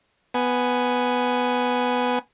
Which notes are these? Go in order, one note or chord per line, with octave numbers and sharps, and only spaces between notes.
B3 G#5